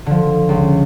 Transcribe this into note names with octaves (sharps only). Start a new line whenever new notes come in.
D3 F3
C#2